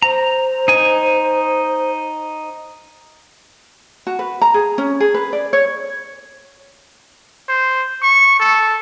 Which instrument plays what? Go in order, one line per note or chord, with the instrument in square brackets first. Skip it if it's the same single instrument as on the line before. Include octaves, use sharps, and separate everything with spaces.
[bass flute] C5 [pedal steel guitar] A#5
[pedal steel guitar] D#4 G#5
[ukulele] F#4
B4
A#5
G#4
C#4
G#4
B4
D5
C#5
[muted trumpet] C5
C#6
A4